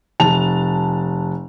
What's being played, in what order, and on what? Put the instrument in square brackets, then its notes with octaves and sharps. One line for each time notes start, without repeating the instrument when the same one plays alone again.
[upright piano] F1 A5 F7